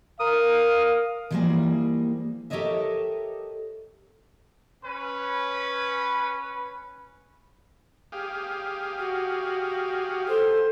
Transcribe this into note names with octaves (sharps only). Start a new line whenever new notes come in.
A#4 F5 D#6
E3 F3 G3 A3 A#3 G#4
G4 A4 A#4 C#5 D#5 E5
C#4 B4
G4 G#4 F5
F#4
A4 C5